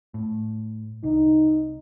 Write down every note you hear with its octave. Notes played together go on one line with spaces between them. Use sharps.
A2
C2 D#4